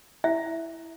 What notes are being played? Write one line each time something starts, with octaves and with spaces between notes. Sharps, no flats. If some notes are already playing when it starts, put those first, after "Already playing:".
E4 E5